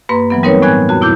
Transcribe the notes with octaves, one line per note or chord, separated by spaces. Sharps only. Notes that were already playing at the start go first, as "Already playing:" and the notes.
G2 A#3 B4 A#5 C6
E3 F#3 B3
G3 C4 D#4 A#4 B4 C#5
A2 B3 G#5 F#6 G#6
F2 F#4
B2 E4 D6 G6